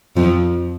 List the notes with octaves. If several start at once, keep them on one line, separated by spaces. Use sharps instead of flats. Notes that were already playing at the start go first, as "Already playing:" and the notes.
F2 F3